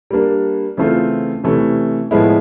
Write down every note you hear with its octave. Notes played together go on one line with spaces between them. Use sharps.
G3 A#3 D4
C#3 E3 A3 C4 F4
C3 E3 A3 C#4
A2 F3 G#3 B3 E4